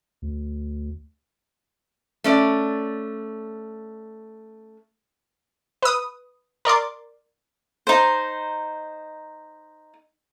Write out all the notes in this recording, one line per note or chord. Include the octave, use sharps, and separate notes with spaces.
D2
A3 C#4 D5
B4 D#6
A#4 D5 C6 D6
D#4 C5